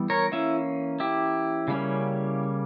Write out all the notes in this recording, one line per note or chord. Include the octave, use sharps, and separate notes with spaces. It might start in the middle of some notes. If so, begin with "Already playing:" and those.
Already playing: E3 G3 B3
A#4 C#5
E3 A#3 C#4 E4
E4 G4
C#3 G3 A#3 C#4